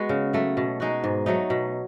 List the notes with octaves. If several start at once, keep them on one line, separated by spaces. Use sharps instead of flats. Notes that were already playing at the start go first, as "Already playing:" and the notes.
Already playing: G#3 B3 F#4
C#3
F#3 A3
B2
G#3 D#4 F#4
G#2
F#3 A3 D#4
B2